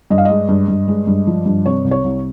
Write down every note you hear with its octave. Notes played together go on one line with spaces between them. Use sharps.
G2 D#5
F5
G#3 D#5
G2
G2
G#3
G2
F3
G2
C3 C#5
C2
C#5
C2